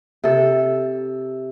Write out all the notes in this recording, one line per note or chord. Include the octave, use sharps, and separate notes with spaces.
C3 A4